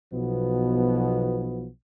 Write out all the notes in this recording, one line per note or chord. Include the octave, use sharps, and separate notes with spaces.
B1 B2 F3 B3